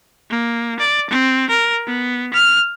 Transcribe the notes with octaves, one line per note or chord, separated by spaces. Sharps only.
A#3
D5
C4
A#4
B3
F6